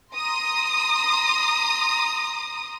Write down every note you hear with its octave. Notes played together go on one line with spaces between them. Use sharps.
A#5 C6 D#6